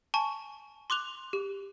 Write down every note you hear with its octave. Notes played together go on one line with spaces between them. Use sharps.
G#5 A5 C#6
C6 D6 F#6 F7
G4